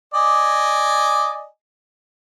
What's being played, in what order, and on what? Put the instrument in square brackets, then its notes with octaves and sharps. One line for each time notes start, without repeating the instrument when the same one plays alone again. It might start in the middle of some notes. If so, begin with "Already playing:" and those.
[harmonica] D5 D#5 G#5